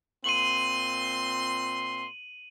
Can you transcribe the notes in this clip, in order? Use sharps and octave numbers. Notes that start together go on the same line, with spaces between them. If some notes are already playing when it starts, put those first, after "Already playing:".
A#2 C4 C6 D#7 F#7